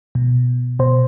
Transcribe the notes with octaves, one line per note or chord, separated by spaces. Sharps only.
B2
B2 C5